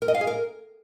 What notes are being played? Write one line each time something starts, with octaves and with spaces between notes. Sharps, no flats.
A#4
D#5
F5
G#4
A#4